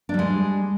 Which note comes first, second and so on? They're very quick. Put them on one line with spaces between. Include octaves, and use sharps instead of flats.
D4 G3 G#3